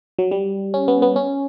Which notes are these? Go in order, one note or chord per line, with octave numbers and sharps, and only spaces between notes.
F#3
G3
C#4
B3
B3
C#4